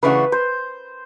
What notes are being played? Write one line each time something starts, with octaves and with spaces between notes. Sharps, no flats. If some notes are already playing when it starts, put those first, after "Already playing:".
C#3 E3 A3 D4 F#4 B4
C5